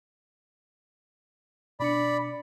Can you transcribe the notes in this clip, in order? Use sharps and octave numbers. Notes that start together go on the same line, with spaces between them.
B2 D4 D5 B5 C#7